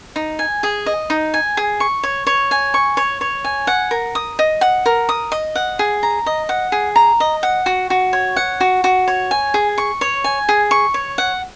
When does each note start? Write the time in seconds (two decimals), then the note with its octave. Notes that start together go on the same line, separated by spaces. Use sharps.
0.16 D#4
0.39 G#5
0.63 G#4
0.86 D#5
1.10 D#4
1.34 G#5
1.57 G#4
1.80 C#6
2.03 C#5
2.27 C#5
2.51 G#5
2.74 C#6
2.97 C#5
3.21 C#5
3.44 G#5
3.67 F#5
3.91 A#4
4.15 D#6
4.39 D#5
4.61 F#5
4.86 A#4
5.09 D#6
5.32 D#5
5.55 F#5
5.79 G#4
6.03 A#5
6.26 D#5
6.49 F#5
6.72 G#4
6.96 A#5
7.20 D#5
7.43 F#5
7.66 F#4
7.90 F#4
8.13 C#5
8.36 F#5
8.61 F#4
8.84 F#4
9.08 C#5
9.31 G#5
9.54 G#4
9.78 C#6
10.01 C#5
10.24 G#5
10.49 G#4
10.71 C#6
10.94 C#5
11.18 F#5